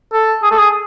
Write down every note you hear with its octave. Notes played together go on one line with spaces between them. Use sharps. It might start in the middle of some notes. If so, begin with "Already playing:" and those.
A4
G#4
A4
G#4